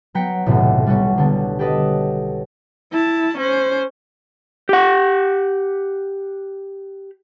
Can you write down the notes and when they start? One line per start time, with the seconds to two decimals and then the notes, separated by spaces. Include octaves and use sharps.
0.15 F#3 B3 G5 A#5 B6 C#7
0.46 D#1 B1 F#2 A2 C3
0.87 G3 B3 C#4
1.18 D3 G3 B3 C#4
1.59 G4 A4 B4 D#5
2.92 E4 A5
3.38 C#4 C5
4.69 G4 F#5